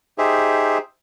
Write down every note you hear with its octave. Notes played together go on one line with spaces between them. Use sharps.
D#4 G4 G#4 C5 E5